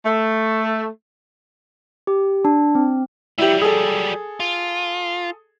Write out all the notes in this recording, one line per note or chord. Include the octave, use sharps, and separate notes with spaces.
A3
G4
D4
C4
F#3 G3 E4 G4
G#4 A4
F4